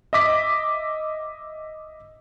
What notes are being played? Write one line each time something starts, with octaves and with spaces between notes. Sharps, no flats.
D#5 E5 D6 B6